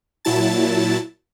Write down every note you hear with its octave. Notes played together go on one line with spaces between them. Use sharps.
A#2 F#3 E4 A5 A6